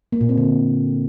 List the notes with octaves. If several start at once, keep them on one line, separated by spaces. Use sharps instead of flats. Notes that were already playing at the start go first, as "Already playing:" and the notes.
A#3
A#2
C4
D3